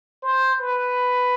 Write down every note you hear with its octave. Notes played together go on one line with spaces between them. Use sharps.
C5
B4